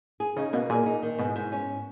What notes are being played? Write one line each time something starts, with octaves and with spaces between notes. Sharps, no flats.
G#4
C#3 D#4
B2 A#3
A#2 G#4
D#4
D#3
G#2 B2
G#2
C#4